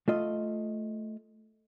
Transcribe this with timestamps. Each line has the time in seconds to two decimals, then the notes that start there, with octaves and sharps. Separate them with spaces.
0.08 A3 F4 D#5